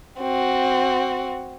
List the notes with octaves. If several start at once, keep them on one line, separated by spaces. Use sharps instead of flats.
C4 F#4